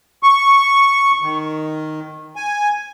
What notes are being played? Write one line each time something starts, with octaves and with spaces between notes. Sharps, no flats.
C#6
D#3
G#5